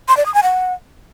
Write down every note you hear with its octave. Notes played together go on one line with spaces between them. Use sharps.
C6
D5
D#6
G#5
F#5